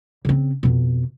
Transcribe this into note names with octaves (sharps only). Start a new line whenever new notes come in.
C#3 C4
F2 B2